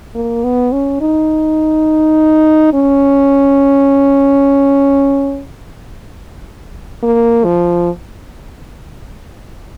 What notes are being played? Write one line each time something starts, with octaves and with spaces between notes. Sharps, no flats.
A#3
B3
C#4
D#4
C#4
A#3
F3